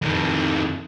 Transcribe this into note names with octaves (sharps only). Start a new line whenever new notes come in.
F2 D#3